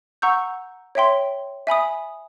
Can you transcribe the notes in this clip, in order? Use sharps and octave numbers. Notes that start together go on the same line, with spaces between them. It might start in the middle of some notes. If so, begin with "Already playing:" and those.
F#5 A#5 C#6 E6 G6
C#5 E5 G5 C6
E5 G#5 B5 D#6